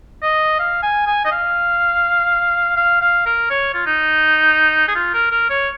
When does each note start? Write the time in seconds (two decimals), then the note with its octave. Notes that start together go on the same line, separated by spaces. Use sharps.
0.23 D#5
0.59 F5
0.83 G#5
1.07 G#5
1.25 D#5
1.32 F5
2.76 F5
3.01 F5
3.26 A#4
3.50 C#5
3.74 F4
3.86 D#4
4.88 G#4
4.95 F4
5.14 A#4
5.31 A#4
5.50 C#5